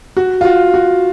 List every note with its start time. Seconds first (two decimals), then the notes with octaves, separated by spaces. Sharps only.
0.17 F#4
0.41 F4
0.45 F#4
0.74 F#4